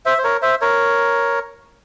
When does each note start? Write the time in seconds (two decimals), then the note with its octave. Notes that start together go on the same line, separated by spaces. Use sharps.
0.06 C5 E5
0.18 C5
0.24 A#4 C#5
0.42 C5 E5
0.61 A#4 C#5